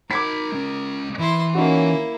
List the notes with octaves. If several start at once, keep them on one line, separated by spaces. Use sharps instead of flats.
D#4 A#4 B5 D6 G#6 B6
G#3 C#4
E3 E4 C6
A#3 C#4 D#4 E4 F#4